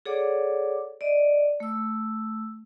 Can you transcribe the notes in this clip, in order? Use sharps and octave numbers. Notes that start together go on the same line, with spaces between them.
G#4 A4 C#5 D5 F#5 D6
D5 D#5
A3 E6